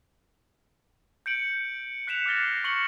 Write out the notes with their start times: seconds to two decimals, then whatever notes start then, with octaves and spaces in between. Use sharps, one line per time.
1.26 G6 C#7 D7 F#7
2.08 F#6 B6 C#7 E7 F7
2.26 D6 F6 F#6 A6 A#6 G7
2.40 C7
2.64 C#6 C#7 F#7 G7